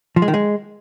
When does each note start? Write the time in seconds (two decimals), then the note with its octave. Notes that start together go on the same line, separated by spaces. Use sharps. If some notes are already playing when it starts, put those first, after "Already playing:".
0.16 F3
0.22 G#3
0.28 D#3
0.34 G#3